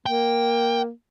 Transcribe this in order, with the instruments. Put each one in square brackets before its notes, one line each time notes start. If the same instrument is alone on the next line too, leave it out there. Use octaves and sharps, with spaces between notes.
[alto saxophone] A#3 [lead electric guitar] G5